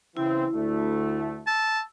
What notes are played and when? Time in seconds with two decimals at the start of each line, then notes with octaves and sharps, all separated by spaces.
0.17 C#3 E3 C4 E4
0.54 D2 A3
1.47 A5 E6